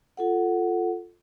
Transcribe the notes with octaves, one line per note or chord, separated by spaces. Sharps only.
F4 A4 F#5